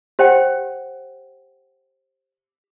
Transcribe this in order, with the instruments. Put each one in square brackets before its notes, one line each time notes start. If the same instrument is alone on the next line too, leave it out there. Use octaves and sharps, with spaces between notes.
[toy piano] G4 C5 F#5 G5